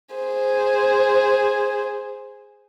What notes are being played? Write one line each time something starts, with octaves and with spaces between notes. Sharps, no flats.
G#4 C5